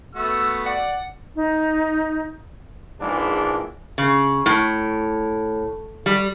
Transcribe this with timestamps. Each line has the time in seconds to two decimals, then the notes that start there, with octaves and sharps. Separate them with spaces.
0.15 A3 B3 F#4 E6
0.66 D5 F#5
1.36 D#4
3.00 A#1 G#2 E3 G#3 D4
3.98 C#3
4.46 A2
6.06 G3